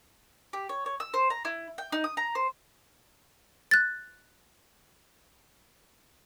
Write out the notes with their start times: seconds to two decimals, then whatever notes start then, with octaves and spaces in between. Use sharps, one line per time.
0.53 G4
0.69 C#5
0.86 C#5
1.00 E6
1.14 C5
1.30 A#5
1.45 E4
1.78 G5
1.92 D#4
2.04 D#6
2.17 A#5
2.35 C5
3.71 F#6 A6